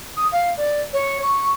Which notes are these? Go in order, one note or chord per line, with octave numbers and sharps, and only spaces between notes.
D#6
F5
D5
C#5
C#6